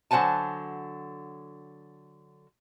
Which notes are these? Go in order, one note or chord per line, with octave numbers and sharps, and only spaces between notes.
D3 F#3 C5 F#5 G#5 A5